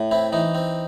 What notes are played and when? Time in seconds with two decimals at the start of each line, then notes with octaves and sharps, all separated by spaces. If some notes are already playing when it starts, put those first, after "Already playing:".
Already playing: A2
0.11 C4 E4
0.32 E3 D#4
0.55 C4